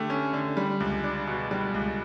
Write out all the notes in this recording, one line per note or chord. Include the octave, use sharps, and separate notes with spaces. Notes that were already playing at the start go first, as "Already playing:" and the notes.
Already playing: D3 A3 G4
C#4
D3
G3
C#2
D4
B2
G3
C#2